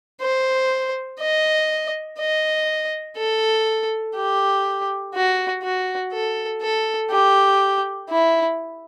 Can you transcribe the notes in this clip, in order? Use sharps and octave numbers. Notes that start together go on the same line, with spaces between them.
C5
D#5
D#5
A4
G4
F#4
F#4
A4
A4
G4
E4